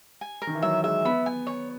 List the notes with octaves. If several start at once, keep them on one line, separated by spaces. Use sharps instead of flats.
G#5
A#4
D#3
E3
F#3 E5
G#3 E5
B3 B5
G#5
C#5